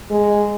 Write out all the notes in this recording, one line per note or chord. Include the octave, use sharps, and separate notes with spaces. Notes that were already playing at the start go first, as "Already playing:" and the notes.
G#3